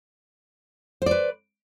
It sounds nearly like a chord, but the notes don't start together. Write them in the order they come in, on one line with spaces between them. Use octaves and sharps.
C5 D5 B4